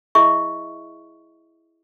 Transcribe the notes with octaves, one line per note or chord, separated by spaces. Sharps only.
E4 G#4 D#5 E5 C#6